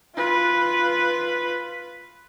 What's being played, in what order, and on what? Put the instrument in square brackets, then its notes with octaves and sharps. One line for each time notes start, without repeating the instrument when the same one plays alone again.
[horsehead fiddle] F4 B4